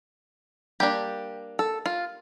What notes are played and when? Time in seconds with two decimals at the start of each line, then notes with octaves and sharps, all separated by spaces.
0.80 G3 A#3 D4 G4
1.59 A4
1.86 F4